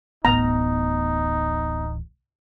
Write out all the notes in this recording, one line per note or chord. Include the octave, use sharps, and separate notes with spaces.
D1 A1 B3 D#4 A#5